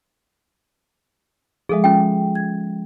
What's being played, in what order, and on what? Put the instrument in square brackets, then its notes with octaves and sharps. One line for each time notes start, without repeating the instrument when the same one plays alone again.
[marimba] F3 G#3 [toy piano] G#4 A4 E5
[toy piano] C#4 F4 G5
[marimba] G#6